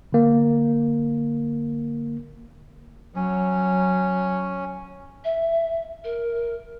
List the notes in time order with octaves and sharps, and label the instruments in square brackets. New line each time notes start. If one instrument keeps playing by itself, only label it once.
[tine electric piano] D3 A#3
[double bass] F#3 [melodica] C#4
[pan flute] E5
A#4